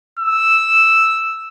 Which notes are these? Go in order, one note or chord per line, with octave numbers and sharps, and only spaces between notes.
E6